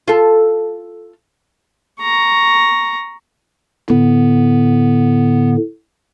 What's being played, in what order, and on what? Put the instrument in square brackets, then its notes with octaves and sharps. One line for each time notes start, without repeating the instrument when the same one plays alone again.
[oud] F4 A4
[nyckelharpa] A#5 C#6
[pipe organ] A2 D3 [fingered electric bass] B3